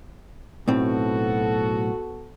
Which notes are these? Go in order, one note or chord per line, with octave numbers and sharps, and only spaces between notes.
B1 A2 B3 C4 F#4 A4